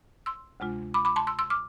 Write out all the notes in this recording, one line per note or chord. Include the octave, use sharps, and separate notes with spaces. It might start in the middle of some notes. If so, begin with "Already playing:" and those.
C6 E6
D2 C3 G#3 D4 F4
B5 D6
B5 D6
A5 C6
C6 E6
C6 E6
D6 F6